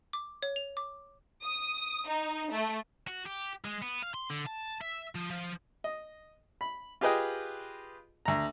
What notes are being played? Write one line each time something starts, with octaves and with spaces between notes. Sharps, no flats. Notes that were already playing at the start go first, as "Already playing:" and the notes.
D6
C#5
F7
D6
D#6
D#4
A3
F#4
G4
G#3
B3
F5
C6
D3
A5
E5
F3
F3
D#5
B5
F4 G4 G#4 B4 D#5 G5
D2 A#5